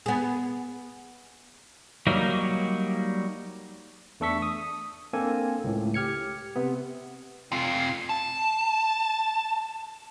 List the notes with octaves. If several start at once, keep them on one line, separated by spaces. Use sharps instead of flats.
B3 G#4
F#3 G3 A#3 D#4
E2 A3 D4 A4 C#6 B6
D#6
A#3 C4 D4 A4 G#5
C#2 A2
G4 F6 G#6 C#7
C3 B3
C3 F4
A5